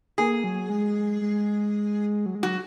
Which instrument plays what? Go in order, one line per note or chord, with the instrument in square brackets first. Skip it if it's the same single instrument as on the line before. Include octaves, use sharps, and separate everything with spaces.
[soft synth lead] A#3 [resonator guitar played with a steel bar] G#4
[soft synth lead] F#3
G#3
G#3
F#3
G#3
[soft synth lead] F#3 [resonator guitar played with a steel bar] F#4